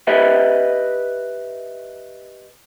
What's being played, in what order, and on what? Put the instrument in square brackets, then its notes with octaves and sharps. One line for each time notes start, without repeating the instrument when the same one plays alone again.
[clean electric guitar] G4 B4 D#5 E5